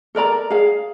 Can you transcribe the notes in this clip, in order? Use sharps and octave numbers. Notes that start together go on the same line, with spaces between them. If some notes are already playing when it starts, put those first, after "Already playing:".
A4 A#4 D5 A#5
G#4 F5